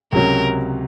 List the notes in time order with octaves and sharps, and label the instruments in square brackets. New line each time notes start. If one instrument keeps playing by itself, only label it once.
[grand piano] C#2 C3 F#3 C#4 [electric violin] A#4